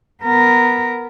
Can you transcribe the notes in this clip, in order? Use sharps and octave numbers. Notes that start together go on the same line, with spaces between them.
B3 A#4